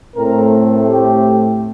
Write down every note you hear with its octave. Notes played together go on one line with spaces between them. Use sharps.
A2 A3 C4 A#4
G4